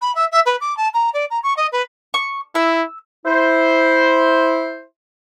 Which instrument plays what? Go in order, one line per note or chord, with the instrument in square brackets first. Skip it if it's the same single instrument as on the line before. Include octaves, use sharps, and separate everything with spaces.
[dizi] B5
E5
E5
B4
D6
A5
A#5
D5
A#5
C#6
D#5
B4
[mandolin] C#6
[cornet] E4 [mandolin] E6
[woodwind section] E4 C5